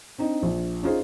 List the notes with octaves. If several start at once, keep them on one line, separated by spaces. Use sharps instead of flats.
C4 D4 D#4
A#1
C#4 D#4 F4 G#4 C5